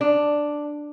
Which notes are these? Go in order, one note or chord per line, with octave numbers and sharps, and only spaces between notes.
D4